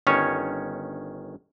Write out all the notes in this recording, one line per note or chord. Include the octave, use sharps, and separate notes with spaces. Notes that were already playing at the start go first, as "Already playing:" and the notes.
G1 D#3 C#4 C#5